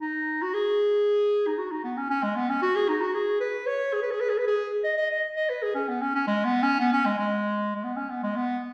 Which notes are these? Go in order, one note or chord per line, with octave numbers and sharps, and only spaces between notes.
D#4
F#4
G#4
D#4
F#4
D#4
B3
C#4
C#4
G#3
B3
C#4
F#4
G#4
D#4
F#4
G#4
B4
C#5
G#4
B4
G#4
B4
G#4
B4
G#4
D#5
D#5
D#5
D#5
B4
G#4
C#4
B3
C#4
C#4
G#3
B3
C#4
B3
C#4
G#3
G#3
G#3
B3
C#4
B3
G#3
B3